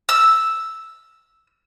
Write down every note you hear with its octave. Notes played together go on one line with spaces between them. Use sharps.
E6